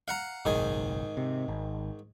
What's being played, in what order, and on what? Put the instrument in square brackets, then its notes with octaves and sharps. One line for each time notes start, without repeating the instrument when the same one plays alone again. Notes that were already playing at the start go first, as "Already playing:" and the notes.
[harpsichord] F5 F#5 A#5
[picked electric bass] F#1 B1 [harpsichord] G#2 D#3 G#4
[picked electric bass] C3
G#1